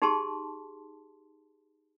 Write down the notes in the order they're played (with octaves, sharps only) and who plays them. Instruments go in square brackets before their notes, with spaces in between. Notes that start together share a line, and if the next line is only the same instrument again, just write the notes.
[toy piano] D#4 G4 G#4 A5 C6